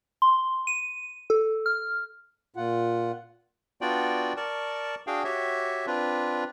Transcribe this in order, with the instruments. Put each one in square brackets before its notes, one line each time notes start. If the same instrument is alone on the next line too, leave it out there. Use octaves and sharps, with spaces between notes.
[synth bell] C6
D#7
A4
F6
[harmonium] A#2 F4 F#5
[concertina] B3 D4 F4 F#4 D5 G5
A#4 D5 A5 C#6
D4 F#4 G#4 F5 G5
F#4 G4 C#5 E5
C4 D4 F4 B4